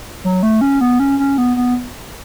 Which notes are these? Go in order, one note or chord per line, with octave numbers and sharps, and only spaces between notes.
F#3
A3
C#4
B3
C#4
C#4
B3
B3